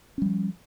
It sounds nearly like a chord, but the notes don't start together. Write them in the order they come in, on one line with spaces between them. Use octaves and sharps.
C#4 G3 F3